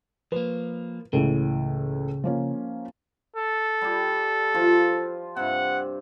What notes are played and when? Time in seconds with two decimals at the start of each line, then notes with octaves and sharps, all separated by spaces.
0.32 F3 A#3 B4
1.13 C#2 A2 C#3 E3
2.24 F3 A#3 C#4
3.36 A4
3.81 G3 G4
4.54 F3 F4
5.36 G2 C3 F#5